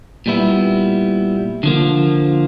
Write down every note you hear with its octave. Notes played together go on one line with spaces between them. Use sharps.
A#2 G3 B3 E4
D3 F3 A#3